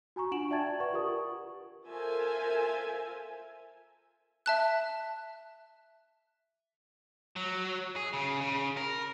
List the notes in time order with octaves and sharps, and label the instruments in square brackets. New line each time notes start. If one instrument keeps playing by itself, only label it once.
[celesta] F#4 G#5 A#5 C#6
D4 F4 F#5 D7 E7 F#7
D5 E5 G5 A5 G#6 A6
F#7
B4 D5 F#5 C#6
F4 G4 A#4 C#6 D#6
[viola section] F4 A4 A#4 C5 E5 G#5
[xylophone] E5 A5 F#6
[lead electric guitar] F#3
G#4
C#3
C#3
A#4